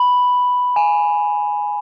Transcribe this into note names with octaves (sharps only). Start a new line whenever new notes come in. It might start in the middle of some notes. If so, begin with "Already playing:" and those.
Already playing: B5
G#5